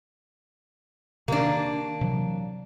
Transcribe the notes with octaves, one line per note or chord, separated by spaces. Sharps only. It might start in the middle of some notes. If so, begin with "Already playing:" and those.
C3 D#3 A#3 D4
C3 E3 F#3